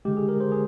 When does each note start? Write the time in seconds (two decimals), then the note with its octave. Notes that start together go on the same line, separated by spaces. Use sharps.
0.05 D3 G#3 G4
0.17 G#4
0.29 A#4
0.40 C5
0.52 G#4